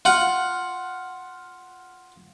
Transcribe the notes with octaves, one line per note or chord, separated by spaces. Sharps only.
F4 F#5